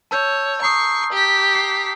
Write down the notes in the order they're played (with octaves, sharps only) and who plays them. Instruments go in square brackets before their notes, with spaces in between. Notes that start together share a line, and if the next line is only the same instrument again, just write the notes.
[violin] C#5 [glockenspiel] A5 E6 G6
[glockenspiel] A#5 D#6 [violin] C#6 C7
[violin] G4 B6
[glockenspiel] C7